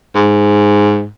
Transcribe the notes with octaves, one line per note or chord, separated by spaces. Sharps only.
G#2